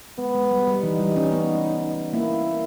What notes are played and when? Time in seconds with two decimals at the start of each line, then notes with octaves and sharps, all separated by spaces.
0.18 G#3 B3
0.35 G#3
0.51 G3
0.67 G3
0.83 E3 D#4
1.00 G3
1.16 C#4
1.32 B3
2.13 A#3 E4